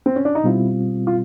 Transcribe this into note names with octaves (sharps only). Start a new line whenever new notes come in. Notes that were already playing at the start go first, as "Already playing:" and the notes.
C4
C#4
D4
D#4
B2 G3 C4 E4 F4
F4